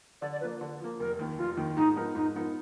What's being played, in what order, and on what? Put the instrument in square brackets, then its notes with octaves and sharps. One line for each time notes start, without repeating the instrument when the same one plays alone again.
[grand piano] D3 [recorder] D5
[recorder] D5
[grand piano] F3 A#3 [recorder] B4
[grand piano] D3
F3 A#3
[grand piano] F1 [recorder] A#4
[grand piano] D#2 D#3
[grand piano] F1 [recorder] F4
[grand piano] D#2 D#3
[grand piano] G#2 [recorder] D#4
[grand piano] F3 B3 D#4 A#4
[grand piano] G#2 [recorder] D#4
[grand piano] F3 B3 D#4 A#4